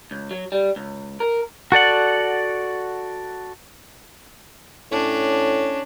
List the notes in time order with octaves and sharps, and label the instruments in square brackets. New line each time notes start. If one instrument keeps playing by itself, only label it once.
[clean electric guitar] C#2
F#3
G3
C#2
A#4
[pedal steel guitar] F#4 A4 D5 F#5
[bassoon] A2 [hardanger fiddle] C#4 D4